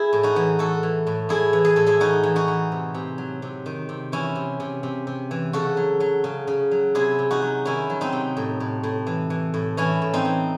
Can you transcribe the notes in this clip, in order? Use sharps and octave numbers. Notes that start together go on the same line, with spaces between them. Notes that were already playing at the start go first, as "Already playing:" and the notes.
Already playing: E4 G#4
A2
D#4 F#4
E3
E3 F#4 A4
E3
A2
A2 E4 G#4
E3
G#4
A2 A4
E4 G#4
E3 D#4 F#4
E3
D#4 F#4
E3
C3
C3
F#3
C3
D#3
C3
E3 C#4 E4
C3
C3
C3
C3
E3
C#3 F#4 A4
F#3
F#3
C#3
C#3
F#3
C3 E4 G#4
C3
D#4 F#4
F#3
D#3 C#4 E4
F#3
C4 D#4
C3
A2
A2
A2
E3
E3
A2
E3 C#4 E4
A2
C4 D#4
E3